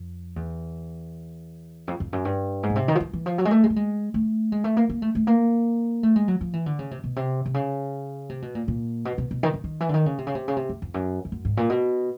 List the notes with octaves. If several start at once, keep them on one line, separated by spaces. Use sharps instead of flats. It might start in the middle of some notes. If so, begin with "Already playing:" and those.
Already playing: F2
E2
F2
F2
F#2
G2
G#2
B2
C3
D#3
F3
E3
E3
F3
F#3
G#3
A3
G#3
A3
G#3
A3
G#3
A3
A#3
A#3
A3
A3
A#3
A3
G#3
F#3
F3
E3
D3
C#3
C3
B2
C3
C3
C#3
C3
B2
A#2
A#2
B2
B2
B2
D#3
D3
D#3
E3
D3
D#3
C#3
C3
C#3
C3
C#3
C3
F#2
F2
F#2
F2
F#2
G#2
A#2
B2